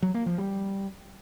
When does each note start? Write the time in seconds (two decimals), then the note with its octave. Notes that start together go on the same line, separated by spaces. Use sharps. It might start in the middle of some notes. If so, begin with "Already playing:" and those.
0.03 F#3
0.14 A#3
0.26 F3
0.38 G3